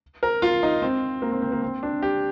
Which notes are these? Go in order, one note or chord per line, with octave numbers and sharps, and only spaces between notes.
A#4
F4
D#4
C4
A#3
C4
C4
A#3
C4
D4
G4